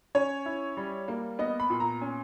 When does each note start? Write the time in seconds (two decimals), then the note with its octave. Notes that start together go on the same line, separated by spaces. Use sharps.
0.15 C#4 C#5
0.46 E4
0.77 G3
1.08 A#3
1.39 B3 D#5
1.60 B5
1.70 A#2
1.80 A#5
2.01 C#4